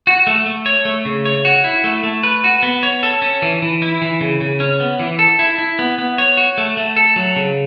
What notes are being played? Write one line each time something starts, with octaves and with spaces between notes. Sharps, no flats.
F#4
A3
A3
C#5
A3
C#3
C#5
F#4
E4
A3
A3
B4
F#4
B3
C#5
A4
C#4
E3
E3
E4
E3
C#3
C#3
C#4
B3
E3
A4
E4
E4
B3
B3
C#5
F#4
A3
A3
A4
F#3
C#3